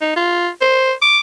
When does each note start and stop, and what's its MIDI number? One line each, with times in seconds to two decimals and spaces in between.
0.01 0.14 63
0.16 0.49 65
0.61 0.92 72
1.02 1.19 86